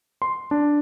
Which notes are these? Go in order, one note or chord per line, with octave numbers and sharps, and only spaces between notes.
C6
D4